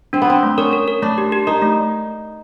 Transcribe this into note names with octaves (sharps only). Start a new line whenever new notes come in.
C4 D4
B3
C4 D4
A3
C#4 A#4
A#4
A#4
A3 D4
G4
G4
D#4 A#4
A3